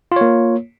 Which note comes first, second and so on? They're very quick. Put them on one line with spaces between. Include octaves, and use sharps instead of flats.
F4 C#5 A#3